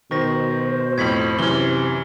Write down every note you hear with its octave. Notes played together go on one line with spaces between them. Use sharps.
B2 D#3 C5 C#6 A#6
F2 A2 G#6 B6 F#7
F#2 C3 E3 F6 G7